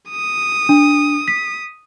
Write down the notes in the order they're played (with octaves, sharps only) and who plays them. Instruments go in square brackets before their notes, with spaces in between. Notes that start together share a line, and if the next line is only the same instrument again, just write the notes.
[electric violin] D#6
[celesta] D4
B6